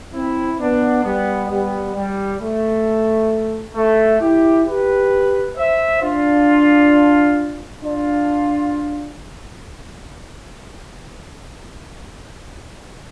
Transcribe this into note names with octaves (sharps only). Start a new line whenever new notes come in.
C4 E4
B3 D4
G3 B3
G3 B3
G3
A3
A3
E4 G4
G4 B4
C5 E5
D4 F4
D4 F4